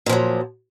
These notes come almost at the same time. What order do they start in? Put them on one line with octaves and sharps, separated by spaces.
A#2 F3 F#3